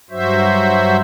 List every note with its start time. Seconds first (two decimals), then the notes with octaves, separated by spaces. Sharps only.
0.10 G2 F#3 F#4 C5 E5